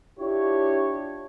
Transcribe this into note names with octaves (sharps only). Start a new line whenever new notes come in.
D4 E4 F4 G4 C#5